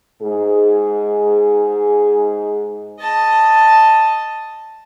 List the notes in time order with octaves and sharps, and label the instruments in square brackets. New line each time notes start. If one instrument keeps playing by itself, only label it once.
[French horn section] G#2 G#4
[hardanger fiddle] D#5 A5